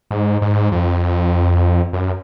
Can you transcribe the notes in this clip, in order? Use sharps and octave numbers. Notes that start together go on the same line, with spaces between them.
G#2
G#2
F2
F#2